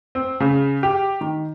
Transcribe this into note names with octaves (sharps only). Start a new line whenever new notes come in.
C4
C#3
G4
D#3